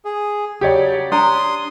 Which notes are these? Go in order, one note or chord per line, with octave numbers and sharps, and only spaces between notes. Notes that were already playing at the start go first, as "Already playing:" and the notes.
G#4
C#3 F#3 G4 C#5 D5
D4 A#5 C6 D#6